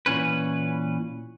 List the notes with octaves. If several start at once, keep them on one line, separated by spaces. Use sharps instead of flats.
A#2 E3 C#4 B4